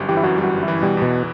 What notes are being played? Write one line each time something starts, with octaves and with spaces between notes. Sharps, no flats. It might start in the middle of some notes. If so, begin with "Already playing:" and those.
Already playing: G1 F#2 G3
E3 G4
E4
F#2 F#4
G3
F#4
G1
E4
E3
B2 G3
E2 B2